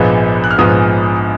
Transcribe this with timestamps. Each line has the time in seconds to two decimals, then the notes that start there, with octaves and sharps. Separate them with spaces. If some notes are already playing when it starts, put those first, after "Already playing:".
Already playing: A#1 G#2 F3 G#3 B3 B5
0.44 F#6
0.51 F6
0.58 A#1 G#2 F3 G#3 B3 D#6